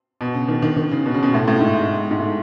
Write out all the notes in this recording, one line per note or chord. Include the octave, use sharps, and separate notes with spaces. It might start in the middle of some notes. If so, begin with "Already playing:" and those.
B2
C#3
D#3
D#3
D#3
C#3
B2
C#3
B2
A2
A2
G#2
G#2
G#2
A2